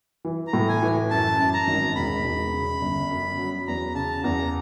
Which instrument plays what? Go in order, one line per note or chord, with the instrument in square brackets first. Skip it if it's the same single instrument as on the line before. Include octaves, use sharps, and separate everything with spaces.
[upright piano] E3
[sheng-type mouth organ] A#5
[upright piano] A2
[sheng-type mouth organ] G#5
[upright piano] E3
[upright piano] F#2 [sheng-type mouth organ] A5
[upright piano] F#2
[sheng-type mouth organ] A#5
[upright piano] G#1
[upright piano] E1 [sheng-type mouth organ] B5
[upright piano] E1
C#3
G1
F#2
F#3
[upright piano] E2 [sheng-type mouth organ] A#5
[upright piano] C#3 [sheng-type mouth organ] A5
[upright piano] E2 [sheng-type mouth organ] A#5